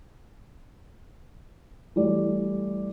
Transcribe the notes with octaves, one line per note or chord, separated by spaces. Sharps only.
E3 G3 A3 E4 G4 D5